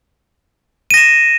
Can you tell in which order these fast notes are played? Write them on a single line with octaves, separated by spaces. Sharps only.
D#7 A#6 E7